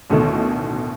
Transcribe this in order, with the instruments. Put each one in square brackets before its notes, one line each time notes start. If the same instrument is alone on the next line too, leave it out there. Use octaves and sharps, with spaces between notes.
[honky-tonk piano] A1 D2 B2 D3 D#3 A3